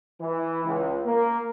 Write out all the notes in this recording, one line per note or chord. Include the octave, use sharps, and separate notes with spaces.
E3
C#2
A#3